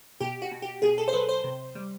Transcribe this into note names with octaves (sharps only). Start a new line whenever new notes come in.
B2 G4
F#4
B2
G4
B2 G#4
A4
C5
F#3 B4
C5
C3
G3